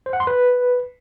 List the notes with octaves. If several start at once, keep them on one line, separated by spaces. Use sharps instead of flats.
C5
F#5
C6
B4